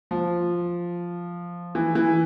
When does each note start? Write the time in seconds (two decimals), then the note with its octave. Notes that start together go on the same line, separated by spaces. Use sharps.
0.11 F3
1.75 E3
1.95 E3